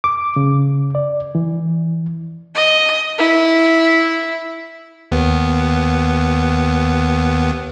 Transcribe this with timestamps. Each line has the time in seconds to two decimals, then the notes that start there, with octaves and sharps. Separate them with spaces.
0.04 D6
0.36 C#3
0.95 D5
1.35 E3
2.55 D#5
3.19 E4
5.12 D#2 B3